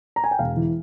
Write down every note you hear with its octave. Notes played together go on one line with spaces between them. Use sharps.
A#5
G#5
G5
E1 F5
E3